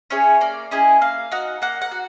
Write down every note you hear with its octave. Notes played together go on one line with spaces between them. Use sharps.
C#4 E4 G#4 C#5
A#3 D5
C#4 E4 G#4 D#5
A#3 F5
D#4 F#4 F#5
A#3 F#5
F#5
F#4